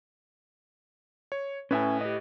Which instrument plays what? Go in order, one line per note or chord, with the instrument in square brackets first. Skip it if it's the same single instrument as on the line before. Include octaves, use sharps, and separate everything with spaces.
[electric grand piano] C#5
[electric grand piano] A2 B4 [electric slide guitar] C#4 E5 G#5
[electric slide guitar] G4 D#5